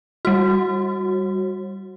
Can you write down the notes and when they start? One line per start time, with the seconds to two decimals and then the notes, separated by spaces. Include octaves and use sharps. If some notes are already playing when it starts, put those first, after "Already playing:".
0.25 G3 F#4